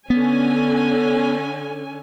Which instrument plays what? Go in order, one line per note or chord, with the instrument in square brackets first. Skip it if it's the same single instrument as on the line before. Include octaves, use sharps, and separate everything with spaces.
[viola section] D3 C#4 G#5 [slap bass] B3